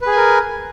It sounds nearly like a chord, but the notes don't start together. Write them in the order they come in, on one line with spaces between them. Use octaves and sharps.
B4 G#4 G#5 A#4